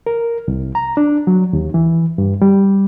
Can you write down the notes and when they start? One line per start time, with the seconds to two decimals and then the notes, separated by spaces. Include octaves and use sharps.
0.06 A#4
0.48 C2
0.75 A#5
0.97 D4
1.27 F#3
1.53 D#2
1.74 E3
2.18 G2
2.42 G3